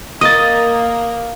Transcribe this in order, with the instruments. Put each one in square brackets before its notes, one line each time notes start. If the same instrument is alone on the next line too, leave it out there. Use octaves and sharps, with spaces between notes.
[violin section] A#3 [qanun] D#5 [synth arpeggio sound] D#6 A6